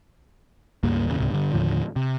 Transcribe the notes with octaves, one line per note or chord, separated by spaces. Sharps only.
C#2 G2 A#3
E2 A#2 C#3
C#2 G#2 C3
G2 D3
D#2 A2 D3 F3
C3